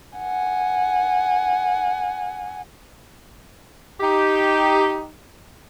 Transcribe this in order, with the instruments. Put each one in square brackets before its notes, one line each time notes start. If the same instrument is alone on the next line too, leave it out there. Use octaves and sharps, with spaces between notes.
[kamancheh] F#5 G#5
[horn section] D#4 G4